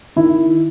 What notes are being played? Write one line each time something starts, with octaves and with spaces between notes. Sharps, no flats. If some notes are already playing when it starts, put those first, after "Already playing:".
D#3 E4